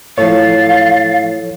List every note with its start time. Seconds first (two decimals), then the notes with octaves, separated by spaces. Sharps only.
0.18 A2 F3 A4 C#5 F5 A6